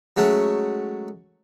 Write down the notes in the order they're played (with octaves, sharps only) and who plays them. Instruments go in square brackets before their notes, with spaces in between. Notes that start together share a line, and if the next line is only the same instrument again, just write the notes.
[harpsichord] F#3 G#3 A3 C#4